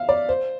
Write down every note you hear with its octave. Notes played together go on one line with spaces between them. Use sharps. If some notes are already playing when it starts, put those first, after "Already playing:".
Already playing: E5 F5
D5
C5